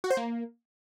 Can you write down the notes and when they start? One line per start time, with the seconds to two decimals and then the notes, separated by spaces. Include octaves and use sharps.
0.04 F#4
0.10 C5
0.17 A#3